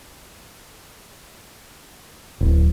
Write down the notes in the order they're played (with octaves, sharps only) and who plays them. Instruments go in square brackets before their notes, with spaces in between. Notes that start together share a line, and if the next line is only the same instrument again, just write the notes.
[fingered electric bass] D1